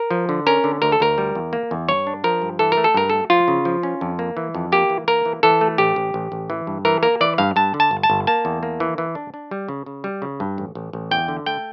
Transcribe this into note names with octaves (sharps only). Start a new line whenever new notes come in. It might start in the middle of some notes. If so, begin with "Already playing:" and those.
Already playing: A#4
F3
D3
C#4 A#4
D3
D2 A#4
A4
D2 A#4
G3
E2
A#3
E2
G2 C#5
D4
F3 A#4
G2
E3 A4
A#4
A3
A4
G2 A#4
A3 A4
F3 F4
C#3
F3
C#4
F2
A#3
E3
F2
A#3 G4
E3
A#3 A#4
E3
E3 A4
A3
A1 G4
A1
A1
A1
E3
G2
E3 A#4
A#3 A#4
E3 D5
G2 F5
G2 A5
D3
A5
G1
A5
G1
A#3 A5
E2
A#3
E3
E3
D4
D4
G3
C#3
C#3
G3
C#3
G2
A1
A1
A1
E2 G5
D3
A3 G5